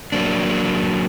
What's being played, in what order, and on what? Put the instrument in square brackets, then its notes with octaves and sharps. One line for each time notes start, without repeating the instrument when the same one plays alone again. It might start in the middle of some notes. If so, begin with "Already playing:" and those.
[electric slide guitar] F#3 A#3 D4